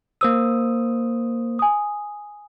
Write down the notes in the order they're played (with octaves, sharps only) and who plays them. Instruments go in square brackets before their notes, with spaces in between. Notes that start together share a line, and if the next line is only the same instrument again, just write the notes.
[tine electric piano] A#3 C5 D#6 [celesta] E6
[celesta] G#5 D#6